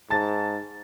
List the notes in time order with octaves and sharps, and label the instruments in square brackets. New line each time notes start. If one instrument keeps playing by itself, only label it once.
[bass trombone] G#2 [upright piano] A5 A6